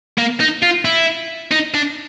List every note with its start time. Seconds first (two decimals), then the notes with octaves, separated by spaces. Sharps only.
0.18 A#3
0.40 D#4
0.62 F4
0.85 E4
1.52 D#4
1.74 D4